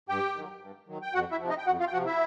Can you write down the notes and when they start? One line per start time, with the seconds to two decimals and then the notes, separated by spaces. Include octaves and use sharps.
0.09 G2 G4 G5
0.35 D#3 F#3
0.62 G2
0.88 D#3 F#3
1.02 G5
1.14 F2 F#4 F#5
1.31 E4 E5
1.40 C3 F3
1.49 D#4 D#5
1.58 G5
1.66 F2 F#4 F#5
1.80 F4 F5
1.87 G5
1.93 F3 F#4 F#5
1.96 C3
2.06 E4 E5